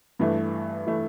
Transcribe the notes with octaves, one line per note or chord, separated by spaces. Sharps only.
G2 E3 A3
E3 A3